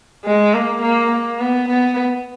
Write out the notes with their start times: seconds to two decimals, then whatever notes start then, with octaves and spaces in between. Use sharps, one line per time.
0.25 G#3
0.54 A#3
0.82 A#3
1.11 A#3
1.40 B3
1.68 B3